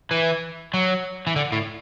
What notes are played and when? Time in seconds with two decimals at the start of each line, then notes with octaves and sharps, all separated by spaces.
0.11 E3
0.74 F#3
1.27 E3
1.36 D3
1.52 A2